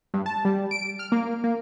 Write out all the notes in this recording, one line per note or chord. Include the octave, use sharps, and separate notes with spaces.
G2
A5
G3
D7
F6
A#3
A#3